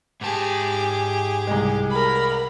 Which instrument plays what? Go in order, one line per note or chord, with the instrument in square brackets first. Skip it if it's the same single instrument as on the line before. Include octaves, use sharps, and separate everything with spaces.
[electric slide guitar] G#2 A5 [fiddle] G4 G#4
[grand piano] C2 G#3
[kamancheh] A#4 B5